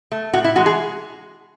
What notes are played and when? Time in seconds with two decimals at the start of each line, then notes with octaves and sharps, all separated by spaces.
0.12 A3
0.33 A2 F#4
0.44 E4
0.56 E3 G#3 F#4
0.66 G#4